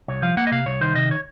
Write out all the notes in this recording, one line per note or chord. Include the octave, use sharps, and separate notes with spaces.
C2 C#5
F3 F5
A#3 F#5
D#5
C3 F5
C2 C#5
D#3 C5
C3 D#5
C#5